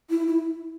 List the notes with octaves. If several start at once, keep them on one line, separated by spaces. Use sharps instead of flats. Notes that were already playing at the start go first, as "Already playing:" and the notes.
E4
E4